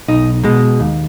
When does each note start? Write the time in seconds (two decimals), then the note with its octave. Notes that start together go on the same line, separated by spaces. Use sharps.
0.08 B1 D#4
0.44 B2 G#3
0.80 D#2